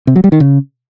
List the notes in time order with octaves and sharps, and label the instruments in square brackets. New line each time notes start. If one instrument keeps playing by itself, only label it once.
[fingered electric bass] C3
F#3
G3
D#3
C#3